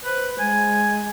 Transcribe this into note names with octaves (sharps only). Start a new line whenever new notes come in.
B4 C5
G#3 G#5